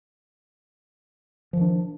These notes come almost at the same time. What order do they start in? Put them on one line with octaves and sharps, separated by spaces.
F3 D#3 D4